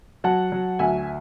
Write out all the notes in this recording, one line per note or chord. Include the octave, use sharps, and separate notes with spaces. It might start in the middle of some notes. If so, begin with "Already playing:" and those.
F#3 F#5 A5
F#3
D2 E5 G#5